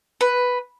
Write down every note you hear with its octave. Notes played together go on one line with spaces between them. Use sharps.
B4